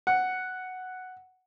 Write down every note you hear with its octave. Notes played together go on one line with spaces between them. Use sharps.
F#5